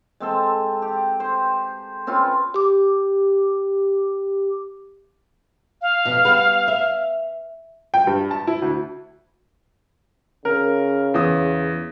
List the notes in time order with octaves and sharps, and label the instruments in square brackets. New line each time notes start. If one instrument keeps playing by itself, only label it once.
[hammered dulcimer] G#3 C4 A4
G4
C5
C4 C#4 F4 B4
[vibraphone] G4 D6
[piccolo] F5
[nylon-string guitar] F2 B2
G3 B3 B4
E5
[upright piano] G5
G2
A5
E4
D2
[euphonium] C#3 [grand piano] A#4
[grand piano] E2 D#6